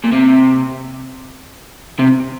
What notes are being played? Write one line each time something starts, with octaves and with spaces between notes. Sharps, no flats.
A#2
C3
C3